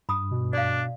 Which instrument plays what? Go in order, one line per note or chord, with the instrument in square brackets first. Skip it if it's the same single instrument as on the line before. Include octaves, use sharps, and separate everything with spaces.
[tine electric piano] G2 [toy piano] B5 D#6
[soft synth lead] B2
[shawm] D4 [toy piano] D5 F5